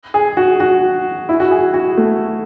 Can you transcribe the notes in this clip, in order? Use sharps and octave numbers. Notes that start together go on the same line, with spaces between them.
G#4
F#4
F#4
E4
F#4
G#4
F#4
A3